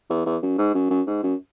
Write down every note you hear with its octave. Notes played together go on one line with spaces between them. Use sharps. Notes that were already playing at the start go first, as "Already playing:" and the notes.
E2
E2
F#2
G#2
F#2
F#2
G#2
F#2